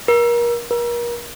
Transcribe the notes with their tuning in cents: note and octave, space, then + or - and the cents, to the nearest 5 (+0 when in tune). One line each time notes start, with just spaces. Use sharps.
A#4 +30
A#4 +35